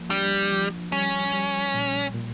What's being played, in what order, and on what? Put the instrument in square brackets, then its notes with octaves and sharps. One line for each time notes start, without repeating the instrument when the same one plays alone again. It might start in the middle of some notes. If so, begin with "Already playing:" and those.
Already playing: [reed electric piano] F3 A#3
[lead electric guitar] G3 [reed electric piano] D4
[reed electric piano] F3
[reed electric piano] G3 [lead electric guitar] C#4
[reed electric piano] G3
A#2
A#2